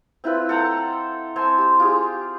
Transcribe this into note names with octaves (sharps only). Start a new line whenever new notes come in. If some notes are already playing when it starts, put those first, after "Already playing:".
C4 E4 F4 B4
A4 F#5 G5 A#5
C4 G#5 A5 C6
G4
F4 G4 G#4